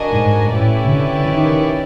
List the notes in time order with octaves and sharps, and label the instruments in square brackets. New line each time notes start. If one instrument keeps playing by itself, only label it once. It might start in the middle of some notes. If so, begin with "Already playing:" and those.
Already playing: [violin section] D4 F#4 A#4 D#5 G#5
[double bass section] G#2
[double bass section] A2 [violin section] C#4 E4 G4 B4 D5
[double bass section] D3
D#3